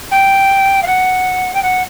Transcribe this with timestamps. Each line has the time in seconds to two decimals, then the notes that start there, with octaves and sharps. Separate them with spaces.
0.11 G5
0.82 F5
0.86 F#5
1.54 G5
1.62 F#5